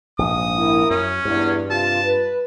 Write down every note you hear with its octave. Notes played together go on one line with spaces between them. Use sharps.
A#1 G#2 D#6
E4 A#4
F#2 C#4
E2 G2
C3 F4 A5
B4